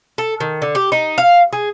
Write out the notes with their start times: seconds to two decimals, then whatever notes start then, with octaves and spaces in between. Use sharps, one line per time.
0.18 A4
0.40 D#3
0.62 D3
0.75 G4
0.92 D#4
1.18 F5
1.53 G#4